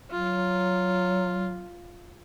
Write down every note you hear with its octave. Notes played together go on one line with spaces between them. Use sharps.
F#3 F4